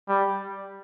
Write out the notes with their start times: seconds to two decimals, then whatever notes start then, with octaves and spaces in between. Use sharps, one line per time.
0.08 G3